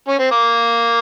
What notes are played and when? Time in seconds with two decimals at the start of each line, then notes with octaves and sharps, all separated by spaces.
0.08 C#4
0.19 C4
0.31 A#3